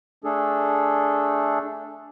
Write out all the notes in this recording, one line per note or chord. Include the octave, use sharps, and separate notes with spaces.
A3 D4 G#4 A4